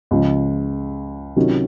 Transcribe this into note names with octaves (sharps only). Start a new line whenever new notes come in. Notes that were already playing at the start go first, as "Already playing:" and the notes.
C#2 C#3 F3
C3 D#3 F#3 C#4 F4